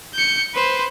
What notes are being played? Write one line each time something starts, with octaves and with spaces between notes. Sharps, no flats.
G6 C#7
B4 C5